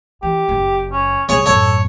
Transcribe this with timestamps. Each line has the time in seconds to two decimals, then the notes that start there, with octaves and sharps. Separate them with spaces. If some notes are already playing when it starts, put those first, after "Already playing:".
0.23 E3 G4
0.48 F#1 F#2
0.92 C#4
1.29 C2 G#4 C#5
1.46 F#2 A2 A4 C#5